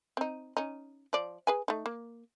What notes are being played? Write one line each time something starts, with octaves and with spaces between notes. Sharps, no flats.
C4 D#4
C#4 D#4
F3 D5
G#4 B4 G#5
A3 D#4
A#3